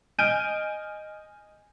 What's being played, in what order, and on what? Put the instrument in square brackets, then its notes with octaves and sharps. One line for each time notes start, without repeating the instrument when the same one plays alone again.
[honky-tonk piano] D#5 G#5 F6 G6 D7 D#7